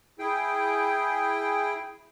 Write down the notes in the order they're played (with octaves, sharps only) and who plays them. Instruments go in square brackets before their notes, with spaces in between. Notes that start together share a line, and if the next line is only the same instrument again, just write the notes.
[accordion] E4 G#4 G5